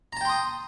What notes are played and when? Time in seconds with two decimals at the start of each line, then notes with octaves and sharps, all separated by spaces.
0.13 A#5
0.17 A5
0.21 G5
0.25 C6
0.29 D#6